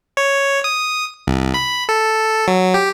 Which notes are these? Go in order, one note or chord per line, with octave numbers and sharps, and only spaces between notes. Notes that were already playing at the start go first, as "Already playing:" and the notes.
C#5
D#6
C2
B5
A4
F#3
G4